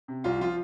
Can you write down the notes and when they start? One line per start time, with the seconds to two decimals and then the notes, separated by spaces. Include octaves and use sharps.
0.08 C3
0.24 C2 F4
0.41 F3 F4